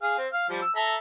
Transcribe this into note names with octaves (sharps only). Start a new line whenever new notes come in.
G#4 F5
C4
F5
F3 G3
E6
A4 E5 A#5